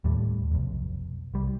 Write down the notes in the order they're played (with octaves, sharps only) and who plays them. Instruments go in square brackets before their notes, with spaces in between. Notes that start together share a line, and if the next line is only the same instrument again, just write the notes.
[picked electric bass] D#2 A2 G3 A3
F1 B1
C2 G3